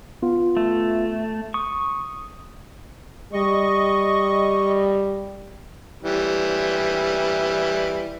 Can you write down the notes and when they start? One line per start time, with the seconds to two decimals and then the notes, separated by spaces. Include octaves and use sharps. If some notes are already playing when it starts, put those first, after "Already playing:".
0.22 B3 F4
0.57 A3
1.54 C#6 D#6
3.33 G3 D#5 C#6
6.03 E3 G3